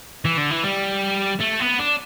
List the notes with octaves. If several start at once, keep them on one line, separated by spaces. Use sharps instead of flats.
E3
D3
E3
G3
A3
B3
D4